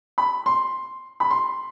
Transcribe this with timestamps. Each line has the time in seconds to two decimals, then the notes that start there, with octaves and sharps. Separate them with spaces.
0.18 B5
0.46 C6
1.20 B5
1.30 C6